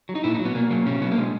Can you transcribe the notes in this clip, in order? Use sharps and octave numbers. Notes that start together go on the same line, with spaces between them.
F#3
D#4
A#2 E4
D#4
F#3
B3
B2 A#3
F#3 A#3
B2 C#4
F#3 B3
A#3
B2 G#3